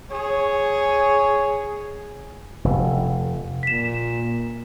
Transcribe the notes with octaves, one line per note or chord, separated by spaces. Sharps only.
G#4 C#5
F1
A#2 B6 E7